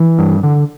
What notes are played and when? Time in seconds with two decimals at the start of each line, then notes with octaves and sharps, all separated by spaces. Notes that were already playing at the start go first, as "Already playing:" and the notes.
Already playing: E3
0.19 G2
0.43 D3